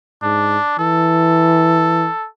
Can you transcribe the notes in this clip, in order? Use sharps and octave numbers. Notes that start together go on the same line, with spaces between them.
G#2 D4
E3 A4